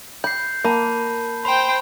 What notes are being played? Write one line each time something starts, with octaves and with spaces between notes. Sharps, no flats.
B5 G6 C7
A#3 A5 B5
C5 G5 B5